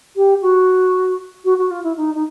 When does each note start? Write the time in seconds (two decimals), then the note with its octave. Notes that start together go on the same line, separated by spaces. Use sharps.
0.16 G4
0.42 F#4
1.44 F#4
1.58 F#4
1.71 F4
1.84 E4
1.97 D#4
2.14 D#4